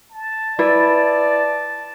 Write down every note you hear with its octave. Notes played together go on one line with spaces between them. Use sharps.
A5
E4 B4 D5